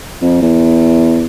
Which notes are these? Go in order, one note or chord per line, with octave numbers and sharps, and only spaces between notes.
F2
E2